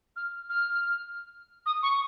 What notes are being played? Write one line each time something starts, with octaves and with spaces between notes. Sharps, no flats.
F6
F6
D#6
C#6